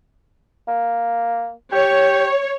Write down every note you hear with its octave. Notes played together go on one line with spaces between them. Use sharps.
A#3
G4 C#5